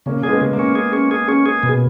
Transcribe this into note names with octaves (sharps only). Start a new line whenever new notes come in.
C#3 A#3 C#4
C#4 G#4
G#3 B3
C#3
A#3
C#4
G#4
C#4
G#4
C#4
G#4
B2